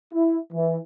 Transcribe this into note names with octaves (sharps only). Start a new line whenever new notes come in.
E4
E3